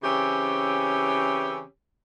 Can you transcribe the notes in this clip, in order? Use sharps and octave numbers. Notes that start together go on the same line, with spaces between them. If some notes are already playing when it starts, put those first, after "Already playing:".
C#3 E3 C4 C#4 G4